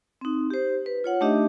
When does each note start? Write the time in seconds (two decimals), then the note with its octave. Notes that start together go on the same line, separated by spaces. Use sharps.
0.21 C4 D#4
0.50 G4 C5
0.86 B4
1.04 F4 C#5 F#5
1.21 A3 D4 D#4 G4 D#5 E5